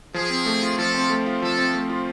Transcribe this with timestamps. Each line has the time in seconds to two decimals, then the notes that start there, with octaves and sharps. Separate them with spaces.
0.14 F3 G#4
0.30 C4
0.46 A3
0.63 F4
0.78 F3 A4
0.95 C4
1.10 A3
1.26 F4
1.42 F3 A4
1.58 C4
1.74 A3
1.90 F4